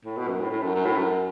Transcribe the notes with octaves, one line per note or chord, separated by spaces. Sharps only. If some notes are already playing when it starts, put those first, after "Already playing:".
A2
B2
F#2
A2
A2
F#2
F#2
A2
F#2